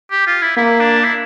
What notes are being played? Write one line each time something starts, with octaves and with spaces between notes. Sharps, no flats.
G4
F4
E4
A#3 E4
D4
E4